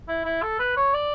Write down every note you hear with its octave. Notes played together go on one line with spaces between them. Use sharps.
E4
E4
A4
B4
C#5
D5